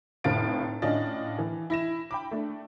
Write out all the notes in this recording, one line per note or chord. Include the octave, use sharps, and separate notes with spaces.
F1 A2 C4 F5 A6 D7
A2 C#4 D4 F4 D#5 A6
E3
E4 A#6 E7
G5 B5 D6
A3 D4